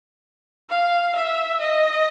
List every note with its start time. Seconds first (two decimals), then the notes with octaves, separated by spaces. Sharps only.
0.70 F5
1.15 E5
1.61 D#5